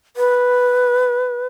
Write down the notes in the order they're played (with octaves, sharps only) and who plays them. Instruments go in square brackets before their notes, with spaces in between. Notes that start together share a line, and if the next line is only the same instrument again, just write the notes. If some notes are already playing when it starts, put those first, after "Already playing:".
[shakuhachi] B4